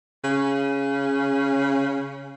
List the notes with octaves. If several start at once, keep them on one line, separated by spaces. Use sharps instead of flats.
C#3